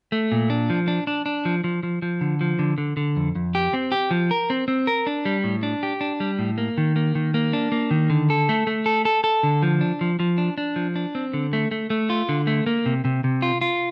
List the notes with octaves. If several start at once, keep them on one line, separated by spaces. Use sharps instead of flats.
A3
A#2
D4
F3
D4
D4
D4
F3
F3
F3
F3
D3
F3
D3
D3
D3
F2
F2
G4
C4
G4
F3
A#4
C4
C4
A#4
D4
G3
A2
D4
G4
D4
G3
A2
A#3
D#3
A#3
D#3
A#3
D4
A#3
D#3
D3
A4
A3
A3
A4
A4
A4
D3
F3
D4
F3
F3
D4
D4
F3
D4
C4
D3
A3
A3
A3
F4
D3
A3
A#3
C3
C3
C3
F4
F4